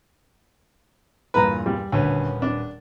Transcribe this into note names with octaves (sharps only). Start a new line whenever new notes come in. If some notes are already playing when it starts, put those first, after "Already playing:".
E2 G2 A#2 B4 A#5
G3
D#1 D2 B3 C#4
D4